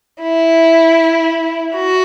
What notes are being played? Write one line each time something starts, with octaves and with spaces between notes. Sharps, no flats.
E4
F#4